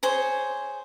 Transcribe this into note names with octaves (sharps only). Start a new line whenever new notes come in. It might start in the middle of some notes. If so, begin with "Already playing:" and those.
G#4 C5 C#5